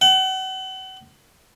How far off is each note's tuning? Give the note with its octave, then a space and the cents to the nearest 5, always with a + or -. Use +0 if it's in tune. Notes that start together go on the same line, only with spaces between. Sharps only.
F#5 +35